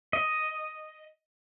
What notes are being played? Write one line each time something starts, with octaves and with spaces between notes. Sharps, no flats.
D#5